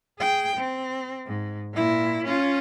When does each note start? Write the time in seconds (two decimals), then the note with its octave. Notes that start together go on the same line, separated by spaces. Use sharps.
0.19 G#4 G5
0.57 C4
1.27 G#2
1.73 A#2 E4
2.25 C#4 F4